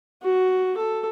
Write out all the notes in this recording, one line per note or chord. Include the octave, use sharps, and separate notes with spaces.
F#4
A4